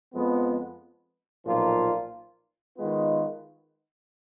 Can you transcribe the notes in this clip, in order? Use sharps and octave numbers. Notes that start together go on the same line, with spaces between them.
F2 F3 G#3 B3
B1 A#2 F3 A#3 F4
D#3 G#3 B3 F4